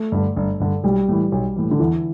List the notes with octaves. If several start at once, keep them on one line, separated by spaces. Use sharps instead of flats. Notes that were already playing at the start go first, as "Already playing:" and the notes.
Already playing: A3
G2 D3
G1
G2 D3
B1 G3
A2 E3
B1
A2 E3
D3
E2 E3